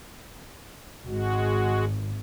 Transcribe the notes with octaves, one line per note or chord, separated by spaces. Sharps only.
G#1 G#3 F#4